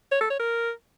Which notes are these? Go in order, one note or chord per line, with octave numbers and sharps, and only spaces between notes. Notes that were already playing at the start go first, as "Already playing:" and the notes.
C#5
A4
C#5
A#4